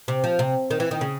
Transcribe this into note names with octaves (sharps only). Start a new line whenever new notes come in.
C3
F3
C3
D#3
E3
D#3
C#3